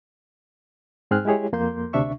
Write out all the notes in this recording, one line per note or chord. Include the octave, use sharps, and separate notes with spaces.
G#2 C4 G#4 F6 F#6
G#3 E4 G4 G#4 C#5
F2 A#3 C6 G6
D2 C3 D4 E5 C#6